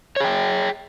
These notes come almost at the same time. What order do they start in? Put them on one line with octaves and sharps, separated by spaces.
C#5 G#4 G5